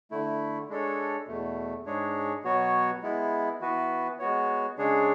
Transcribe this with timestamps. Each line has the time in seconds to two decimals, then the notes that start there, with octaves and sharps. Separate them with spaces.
0.11 D3 A3 E4
0.69 G#3 D4 A4 C#5
1.27 E2 B2 A3
1.85 G#2 G#3 D4 G#4 C#5
2.44 B2 F#3 B3 F#4 C#5
3.02 G#3 B3 E4
3.61 E3 B3 F#4 B4
4.19 G#3 B3 F#4 C#5
4.78 C#3 G#3 D4 G#4 C#5